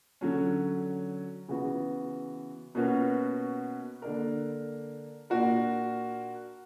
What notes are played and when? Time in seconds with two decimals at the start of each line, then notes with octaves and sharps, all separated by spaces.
0.21 D3 F#3 C#4
1.48 C#3 E3 B3 F#4
2.75 B2 A#3 C#4 F#4 B4
4.02 D3 A#3 D4 A#4
5.30 A#2 A#3 D4 F#4 A#4